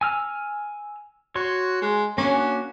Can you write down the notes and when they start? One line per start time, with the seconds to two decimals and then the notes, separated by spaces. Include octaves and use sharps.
0.01 G#5 E6 F6
1.35 F#4 C#5 C6
1.82 G#3
2.18 A#3 C#4 D4 F#4